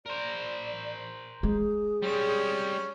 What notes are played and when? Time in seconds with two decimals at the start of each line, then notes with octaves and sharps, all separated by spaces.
0.06 A#4 C5 D5
1.43 G#3 G#4
2.02 G3 C#4 C5